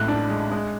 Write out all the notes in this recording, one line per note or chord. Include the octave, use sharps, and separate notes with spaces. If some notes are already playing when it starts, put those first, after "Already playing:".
Already playing: A1 A2 G#3 F#6
D4
G#3
G#3